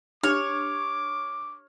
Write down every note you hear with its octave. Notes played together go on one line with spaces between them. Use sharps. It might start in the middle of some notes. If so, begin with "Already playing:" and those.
D4 G4 C#5 D6 F6